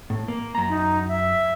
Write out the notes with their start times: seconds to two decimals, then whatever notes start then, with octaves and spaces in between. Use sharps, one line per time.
0.10 A2
0.28 A#3
0.55 F#2 A#5
0.69 D#4
1.08 E5